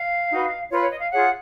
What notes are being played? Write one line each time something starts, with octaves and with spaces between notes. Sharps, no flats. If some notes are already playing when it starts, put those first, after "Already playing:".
Already playing: F5
D#4 F#4 B4
F4 B4 C#5
C#5
D#5
F5
F4 G#4 C#5 F#5